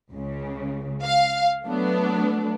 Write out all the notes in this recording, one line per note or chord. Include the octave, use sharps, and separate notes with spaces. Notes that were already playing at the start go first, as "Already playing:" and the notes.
C#2 C#3
F5
F#3 A3 B3 D4